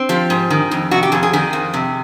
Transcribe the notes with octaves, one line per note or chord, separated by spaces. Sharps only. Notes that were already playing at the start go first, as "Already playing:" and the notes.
Already playing: C4
F3 G4
G#2
D#3
F2
C3 F#4
G4
F2 G#4
G#4
D#3 G#4
F2
C3